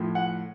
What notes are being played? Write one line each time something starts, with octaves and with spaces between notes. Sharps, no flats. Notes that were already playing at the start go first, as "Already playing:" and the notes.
Already playing: A2 F3
F#5